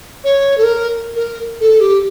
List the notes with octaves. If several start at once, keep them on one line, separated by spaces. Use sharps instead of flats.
C#5
A4
A#4
A#4
A4
G4